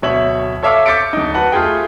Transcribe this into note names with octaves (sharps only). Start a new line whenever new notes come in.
D1 B2 C#5 E5 F#7
A4 C#5 E5 F5 D6 E6
D6 G6 A6 B6 C#7 D7
D1 D#4
F#4 B4 F#5 A5
A3 F4 G4 G#4 G5